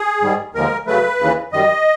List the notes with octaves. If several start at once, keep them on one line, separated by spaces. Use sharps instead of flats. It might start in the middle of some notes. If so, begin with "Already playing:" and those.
Already playing: G#4
G#2 D#3 G3
D#2 D3 F3 G#3 A#4
F#2 C#3 F#3 A3 B4
D#2 C#3 E3
F#2 D#3 G3 D#5